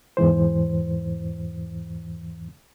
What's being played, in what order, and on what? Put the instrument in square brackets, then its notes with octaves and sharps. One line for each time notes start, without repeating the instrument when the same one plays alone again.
[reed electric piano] E2 G#2 E3 C5